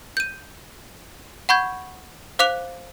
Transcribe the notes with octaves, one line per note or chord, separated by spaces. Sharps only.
G6 D#7
F#5 B5 C#6 G6 G#6
C5 F5 D6 F#6 F7